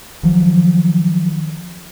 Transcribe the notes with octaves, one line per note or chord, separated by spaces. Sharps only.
D#3 F3 F#3